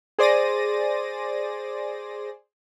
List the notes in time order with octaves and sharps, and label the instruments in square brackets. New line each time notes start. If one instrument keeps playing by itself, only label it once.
[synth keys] G#4 C5 D5 A6 A#6 D#7